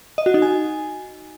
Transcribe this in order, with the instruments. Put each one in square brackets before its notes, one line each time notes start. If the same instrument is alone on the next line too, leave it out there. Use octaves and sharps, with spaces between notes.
[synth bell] D#5
F#4
D#4
G#5